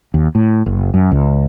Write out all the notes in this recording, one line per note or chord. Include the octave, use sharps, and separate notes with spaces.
D#2
A2
F#1
F#2
C#2